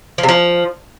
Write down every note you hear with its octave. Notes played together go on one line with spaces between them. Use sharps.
F3
C3
F3